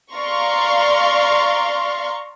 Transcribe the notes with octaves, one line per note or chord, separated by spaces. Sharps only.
D5 F5 A#5 C6 C#6